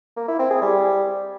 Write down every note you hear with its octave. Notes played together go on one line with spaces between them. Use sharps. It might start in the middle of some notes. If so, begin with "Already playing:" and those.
A#3
E4
C4
G#4
G3